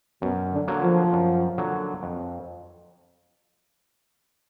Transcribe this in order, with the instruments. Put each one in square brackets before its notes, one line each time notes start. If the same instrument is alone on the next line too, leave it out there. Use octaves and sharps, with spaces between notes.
[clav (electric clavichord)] F#2 [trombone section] B2
[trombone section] D3
[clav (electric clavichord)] D3 F#3 A#3
[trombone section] F3
[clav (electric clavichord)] F#2
D3 F#3 A#3
F2